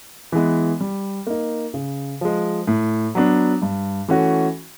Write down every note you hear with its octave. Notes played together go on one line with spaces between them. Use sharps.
E3 G#3 B3
G3
A#3 D#4
C#3
F3 G#3
A2
F#3 B3 D4
G2
E3 A3 C#4 F#4